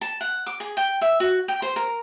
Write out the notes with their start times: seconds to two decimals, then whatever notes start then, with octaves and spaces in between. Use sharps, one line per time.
0.01 A5
0.21 F#5
0.47 D6
0.60 G#4
0.77 G5
1.01 E5
1.20 F#4
1.48 G5
1.62 C5
1.76 A#4